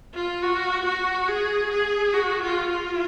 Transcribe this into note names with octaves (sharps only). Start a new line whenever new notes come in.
F4
F#4
F#4
G#4
G#4
F#4
F4
F4